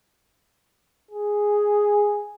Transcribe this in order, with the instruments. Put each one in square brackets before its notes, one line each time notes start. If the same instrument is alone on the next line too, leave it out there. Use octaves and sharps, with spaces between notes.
[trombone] G#4